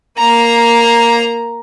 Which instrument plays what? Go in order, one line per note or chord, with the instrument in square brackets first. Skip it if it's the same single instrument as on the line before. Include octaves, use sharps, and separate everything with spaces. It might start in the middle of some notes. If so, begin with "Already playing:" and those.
[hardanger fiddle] A#3 A#5